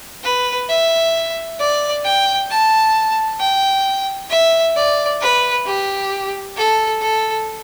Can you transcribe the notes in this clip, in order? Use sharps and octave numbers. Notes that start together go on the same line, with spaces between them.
B4
E5
D5
G5
A5
G5
E5
D5
B4
G4
A4
A4